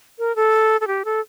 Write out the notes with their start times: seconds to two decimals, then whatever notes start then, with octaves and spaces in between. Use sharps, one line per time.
0.19 A#4
0.36 A4
0.81 A4
0.87 G4
1.05 A4